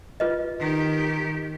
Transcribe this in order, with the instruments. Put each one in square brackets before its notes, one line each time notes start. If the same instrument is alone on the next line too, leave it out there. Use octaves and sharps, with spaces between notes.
[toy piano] F4 B4 D#5
[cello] D#3 G4